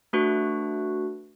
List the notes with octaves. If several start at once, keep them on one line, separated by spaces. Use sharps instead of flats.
A3 D4 F#4 B4